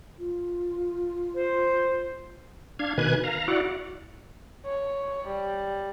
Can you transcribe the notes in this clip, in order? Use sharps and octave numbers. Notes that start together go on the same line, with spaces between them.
F4
C5
D4 F5 G#6
B2 D#3 B4 G#5 F#6 G#6
F5 A#5
E4 F#4 D5 F#5
C#5
G3